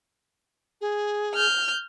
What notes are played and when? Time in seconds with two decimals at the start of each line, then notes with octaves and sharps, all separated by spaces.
0.81 G#4
1.35 F6 G6